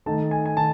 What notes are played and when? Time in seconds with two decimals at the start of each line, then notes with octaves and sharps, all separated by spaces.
0.06 D#3 A3 D#4 A5
0.31 G#5
0.46 G#5
0.57 D#3 A5